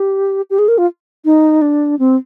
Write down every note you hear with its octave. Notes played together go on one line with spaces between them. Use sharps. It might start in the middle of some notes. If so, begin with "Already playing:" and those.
Already playing: G4
G4
G#4
A#4
F4
D#4
D4
C4